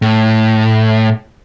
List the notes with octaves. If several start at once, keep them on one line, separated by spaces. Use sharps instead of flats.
A2